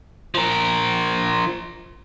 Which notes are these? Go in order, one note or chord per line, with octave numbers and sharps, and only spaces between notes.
F3 A#4